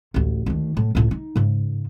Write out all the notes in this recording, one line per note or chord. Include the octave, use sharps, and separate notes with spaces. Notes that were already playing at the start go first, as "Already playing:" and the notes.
A1 D2
D2 D#3
A2
C#2 A2
D#4
G#2 C#3